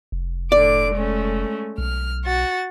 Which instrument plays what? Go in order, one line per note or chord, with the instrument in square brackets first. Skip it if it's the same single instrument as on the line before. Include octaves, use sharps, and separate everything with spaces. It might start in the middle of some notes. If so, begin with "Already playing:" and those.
[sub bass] F1
[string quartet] A2 D3 D6 [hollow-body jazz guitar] D5
[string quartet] G#3 A3 C#4
[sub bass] B1 [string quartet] F6
[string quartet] F#4 A6